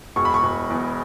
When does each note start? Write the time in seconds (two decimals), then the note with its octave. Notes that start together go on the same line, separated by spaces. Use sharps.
0.16 E1 C#6
0.25 B5
0.34 C#6
0.43 E1
0.70 E2